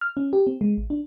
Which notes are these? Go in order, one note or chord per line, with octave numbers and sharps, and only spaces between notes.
F6
C#4
G4
C4
G#3
A1
D4